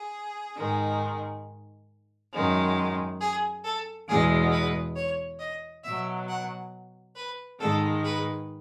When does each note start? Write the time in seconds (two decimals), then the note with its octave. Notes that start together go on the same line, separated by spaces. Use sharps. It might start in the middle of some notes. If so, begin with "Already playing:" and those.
Already playing: G#4
0.56 G#2 D#3 G#3
2.32 F#2 D#3 G#3
3.20 G#4
3.64 A4
4.08 E2 B2 G#3 G#4
4.51 B4
4.96 C#5
5.39 D#5
5.84 B2 F#3 E5
6.28 F#5
7.15 B4
7.59 G#2 D#3 G#3 A4
8.04 B4